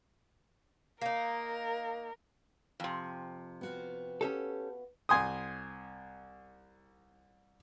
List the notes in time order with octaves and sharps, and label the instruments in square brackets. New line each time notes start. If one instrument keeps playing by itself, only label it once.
[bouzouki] A#3 D#4 [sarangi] A#4
[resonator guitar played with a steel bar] F2 C3
[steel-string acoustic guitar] B3 F#4 F5
[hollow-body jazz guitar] C#4 G4 A4
[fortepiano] C2 G#5 C6 D#6